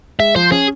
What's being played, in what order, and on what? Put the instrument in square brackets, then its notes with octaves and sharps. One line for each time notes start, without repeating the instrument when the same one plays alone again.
[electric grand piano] G#3 [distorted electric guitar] E5
[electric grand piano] F3 [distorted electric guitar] C5
[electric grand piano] C#4 [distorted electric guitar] G#4